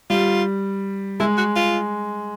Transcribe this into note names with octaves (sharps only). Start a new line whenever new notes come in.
G3 F4
G#3 E4
F#4
F4